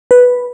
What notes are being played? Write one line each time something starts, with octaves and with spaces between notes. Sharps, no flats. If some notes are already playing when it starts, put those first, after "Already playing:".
B4